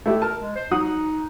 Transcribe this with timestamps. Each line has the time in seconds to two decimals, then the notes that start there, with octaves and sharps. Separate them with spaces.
0.06 A3 E4 G4
0.22 A#4 A5
0.42 G#3
0.56 C5
0.71 F#3 D#4 F#5 D#6